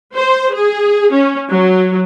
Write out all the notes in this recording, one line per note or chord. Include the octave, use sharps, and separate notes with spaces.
C5
G#4
C#4
F#3